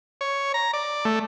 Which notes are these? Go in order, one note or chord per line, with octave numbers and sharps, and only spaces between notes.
C#5
A#5
D5
A3